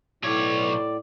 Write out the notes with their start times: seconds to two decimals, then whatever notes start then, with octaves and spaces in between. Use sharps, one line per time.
0.24 B1 A2 C#5 D5